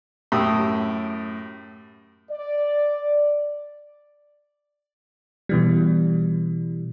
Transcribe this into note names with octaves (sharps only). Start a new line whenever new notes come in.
F#2 A2 G4 D#6 E6
D5
B2 E3 G3